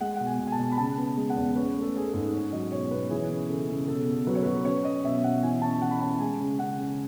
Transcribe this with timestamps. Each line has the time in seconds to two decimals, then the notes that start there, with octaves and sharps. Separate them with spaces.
0.01 G#3 F#5
0.16 B2 F#5
0.27 G#5
0.39 B2
0.47 G#5
0.52 A5
0.59 B2
0.72 B5
0.78 C#3 A5
0.97 B3
1.17 G#3
1.30 F#5
1.36 E2
1.55 C#4 B4
1.75 A3
1.81 A4
1.94 C#4 G#4
2.07 A4
2.14 G#2
2.33 C#4
2.53 F#3 D#5
2.71 B2 C#5
2.91 B2 B4
3.10 E3 G#4
3.30 C#4
3.49 C#3 A4
3.68 C#3
3.88 B2 A4
4.08 B2
4.27 F#3 B4
4.35 C#5
4.43 B4
4.46 F#3
4.65 C#4 C#5
4.84 C#4 D#5
5.04 B2 E5
5.23 B2 F#5
5.43 E3 G#5
5.62 C#4 A5
5.81 E3 F#5
5.91 B5
6.01 C#4 A5
6.20 G#3 G#5
6.40 C#3
6.59 C#3 F#5
6.79 C#3